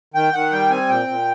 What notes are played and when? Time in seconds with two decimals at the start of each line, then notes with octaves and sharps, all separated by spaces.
0.14 D#3 G5
0.33 D#3 F#5
0.51 G3 G5
0.70 C4 G#5
0.89 A#2 G5
1.07 A#2